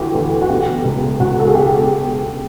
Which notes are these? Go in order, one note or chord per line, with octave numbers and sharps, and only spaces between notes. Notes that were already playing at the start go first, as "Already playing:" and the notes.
Already playing: D2 E3 F#4 G4
D2
F#4
B2 G4
C#2
C#2 F#4
A4
G#4
B2 G4